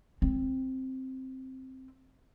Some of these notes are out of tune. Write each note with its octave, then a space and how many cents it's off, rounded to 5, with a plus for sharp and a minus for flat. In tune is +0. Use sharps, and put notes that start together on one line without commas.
C4 +5